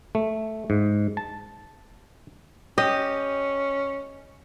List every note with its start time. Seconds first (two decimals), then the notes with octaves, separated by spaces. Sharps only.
0.15 A3
0.70 G#2
1.17 A5
2.78 C#4 G4 D#5